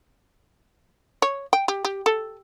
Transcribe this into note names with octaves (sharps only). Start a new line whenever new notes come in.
C#5
G5
G4
G4
A4